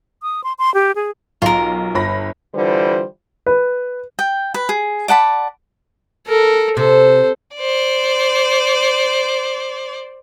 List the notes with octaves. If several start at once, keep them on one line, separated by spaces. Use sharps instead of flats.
D#6
C6
C6
G4
G#4
B1 F4 A#4
G1 B5 A#6
D3 E3 G3 F4 C5
B4
G5
B4
G#4
D5 F#5 A5 B5
A4 A#4
C3 A4 C5
C5 D5